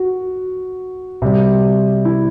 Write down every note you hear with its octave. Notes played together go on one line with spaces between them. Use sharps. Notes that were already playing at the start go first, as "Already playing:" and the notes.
Already playing: F#4
C3 G3
E4